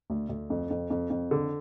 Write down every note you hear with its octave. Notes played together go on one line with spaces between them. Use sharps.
D2
D2
F2
F2
F2
F2
D3